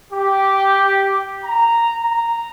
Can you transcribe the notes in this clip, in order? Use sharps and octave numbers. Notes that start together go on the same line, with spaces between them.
G4
A#5
A#5